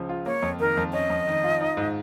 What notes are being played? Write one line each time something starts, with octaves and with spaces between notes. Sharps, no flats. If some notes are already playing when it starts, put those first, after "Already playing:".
Already playing: C#2 C#3 F3
F4
A#3 C#5
F2
D#3 A#4
F2
C#4 D#5
F2
D#3
F4
D#4
G#2